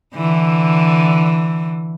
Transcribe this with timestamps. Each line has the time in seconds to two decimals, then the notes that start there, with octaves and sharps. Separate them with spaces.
0.15 D3 E3